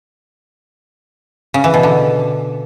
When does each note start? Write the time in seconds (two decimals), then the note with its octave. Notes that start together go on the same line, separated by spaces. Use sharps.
1.54 C#3
1.64 E3
1.74 B2
1.83 D3